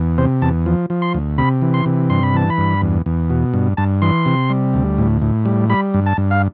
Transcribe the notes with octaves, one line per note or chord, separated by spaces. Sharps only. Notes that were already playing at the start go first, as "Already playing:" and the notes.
Already playing: E2
C3 C5
E2 A5
F3
F3
C6
D2
C3 B5
E3
C6
C3
G2 C6
B5
E3 A5
B5
G2
E2
E2
B2
G2
G2 A5
E3 C6
C3
G3
D2
A2
A2
G3
G3 B5
G2
A5
G2
F5